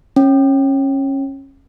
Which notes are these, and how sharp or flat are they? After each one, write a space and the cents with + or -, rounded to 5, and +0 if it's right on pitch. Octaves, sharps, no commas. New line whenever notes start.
C#4 -25